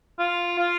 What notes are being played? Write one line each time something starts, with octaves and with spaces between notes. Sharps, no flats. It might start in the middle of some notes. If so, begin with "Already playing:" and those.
F4
F4